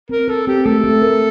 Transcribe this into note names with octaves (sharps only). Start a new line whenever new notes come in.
C4 A#4
A4 A#4
C4 G4
A3 A4
A3
A#4